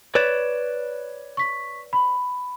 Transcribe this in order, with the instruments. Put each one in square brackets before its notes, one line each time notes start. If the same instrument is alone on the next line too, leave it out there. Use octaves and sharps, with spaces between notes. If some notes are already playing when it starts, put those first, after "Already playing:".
[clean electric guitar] B4 C#5 D5 [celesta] E7
[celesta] C#6 B6
B5